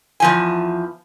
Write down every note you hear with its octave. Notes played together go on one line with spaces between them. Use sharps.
E2 F3 G#5